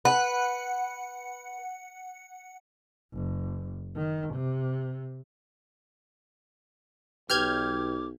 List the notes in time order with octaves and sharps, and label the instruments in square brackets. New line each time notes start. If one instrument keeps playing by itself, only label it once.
[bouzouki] B4 [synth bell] F#5
[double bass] F#1
D#3
C3
[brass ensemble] B1 [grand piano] G4 B4 [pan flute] D6 [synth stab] F6 G6 G#6